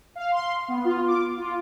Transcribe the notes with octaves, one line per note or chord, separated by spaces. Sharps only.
F5
C6
B3
F4
D6
F4